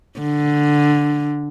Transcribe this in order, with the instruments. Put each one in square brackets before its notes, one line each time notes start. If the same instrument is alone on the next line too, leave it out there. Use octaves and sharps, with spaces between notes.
[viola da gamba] D3